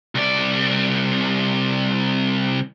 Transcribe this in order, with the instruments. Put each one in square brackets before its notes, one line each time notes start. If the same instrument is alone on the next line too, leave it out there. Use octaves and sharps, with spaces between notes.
[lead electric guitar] C2 D5